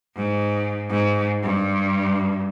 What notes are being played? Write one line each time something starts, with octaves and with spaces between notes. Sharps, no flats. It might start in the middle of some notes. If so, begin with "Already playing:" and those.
G#2
G#2
G2